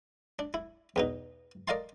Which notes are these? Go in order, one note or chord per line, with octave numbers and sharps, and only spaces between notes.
D4
E4
E2 B2 D#4
A#4 D5 D#5 F5 A5 C6